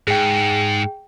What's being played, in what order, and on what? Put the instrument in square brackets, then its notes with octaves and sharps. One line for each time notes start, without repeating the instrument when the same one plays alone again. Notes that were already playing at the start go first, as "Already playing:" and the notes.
[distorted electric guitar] G#2 [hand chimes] G#4 G5